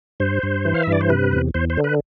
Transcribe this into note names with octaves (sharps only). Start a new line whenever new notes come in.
G2 C5
G2
E3
F5
G2 E5
D5
C5
C3 B4
E2
E2 C5
C5
D3
B4